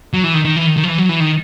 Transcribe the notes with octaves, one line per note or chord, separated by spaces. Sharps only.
F#3
E3
D#3
D#3
E3
D#3
D#3
F3
E3
F#3
E3
D#3